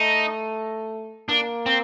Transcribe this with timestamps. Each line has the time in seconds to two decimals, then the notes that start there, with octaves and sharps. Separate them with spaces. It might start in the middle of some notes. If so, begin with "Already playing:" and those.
Already playing: A3 D#4
1.29 A#3 D4
1.66 C4